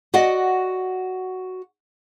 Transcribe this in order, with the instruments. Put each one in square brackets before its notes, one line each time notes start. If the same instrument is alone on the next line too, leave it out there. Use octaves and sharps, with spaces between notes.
[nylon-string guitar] F#4 D5 D#5 F#5